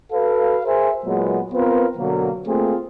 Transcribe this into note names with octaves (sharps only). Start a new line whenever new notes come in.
F#4 A4 B4 F5
G#4 A#4 C5 E5 G#5
A#2 F#3 G#3 B3
B3 C4 F4 A#4 B4
B2 D3 F#3 A#3
A3 A#3 C4 F4 G#4